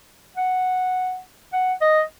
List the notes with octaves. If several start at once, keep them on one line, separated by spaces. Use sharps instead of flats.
F#5
F#5
D#5